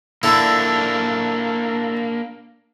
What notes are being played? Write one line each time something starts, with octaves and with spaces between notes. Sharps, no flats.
D3 A#3 D4 E4